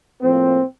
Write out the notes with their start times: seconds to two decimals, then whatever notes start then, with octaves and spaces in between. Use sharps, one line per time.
0.21 A2 F3 A#3 C4